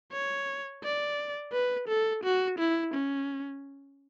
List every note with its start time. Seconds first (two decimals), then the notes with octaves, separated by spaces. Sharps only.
0.13 C#5
0.83 D5
1.53 B4
1.88 A4
2.24 F#4
2.59 E4
2.94 C#4